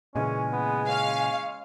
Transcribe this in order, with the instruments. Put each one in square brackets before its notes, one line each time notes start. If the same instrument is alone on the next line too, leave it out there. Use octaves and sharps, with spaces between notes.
[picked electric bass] A#2 C#3 E3 [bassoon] G#3 [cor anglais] C#4
[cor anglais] B3
[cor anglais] C#4 [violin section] F5